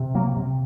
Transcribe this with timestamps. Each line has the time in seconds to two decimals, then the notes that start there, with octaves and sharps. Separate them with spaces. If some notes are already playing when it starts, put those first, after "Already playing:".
Already playing: C3
0.15 F#3 A#3
0.37 C3